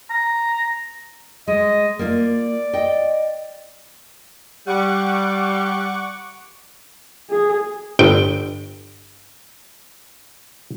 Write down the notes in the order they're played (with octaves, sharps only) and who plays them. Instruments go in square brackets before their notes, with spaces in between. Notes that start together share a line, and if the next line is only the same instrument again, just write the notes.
[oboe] A#5
[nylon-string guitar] G#3 [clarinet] D#5
[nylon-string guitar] A#3 F4 [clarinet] D5
[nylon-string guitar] D#5 G5
[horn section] G3 [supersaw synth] F#5 C#6 D6
[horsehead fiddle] G#4
[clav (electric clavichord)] G1 G5